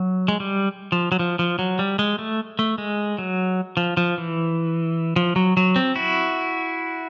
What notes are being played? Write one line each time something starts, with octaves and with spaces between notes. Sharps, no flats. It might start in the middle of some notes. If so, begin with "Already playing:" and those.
Already playing: F#3
G#3
G3
F3
F#3
F3
F3
F#3
G3
G#3
A3
A3
G#3
F#3
F3
F3
E3
F3
F#3
F#3
C4
E4 F#4